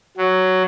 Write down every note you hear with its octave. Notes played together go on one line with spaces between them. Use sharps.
F#3